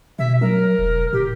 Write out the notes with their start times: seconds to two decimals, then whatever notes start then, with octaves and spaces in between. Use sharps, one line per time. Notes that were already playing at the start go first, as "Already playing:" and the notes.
0.19 B2 E5
0.41 F#3 A#4
0.79 E1
1.13 A2 G4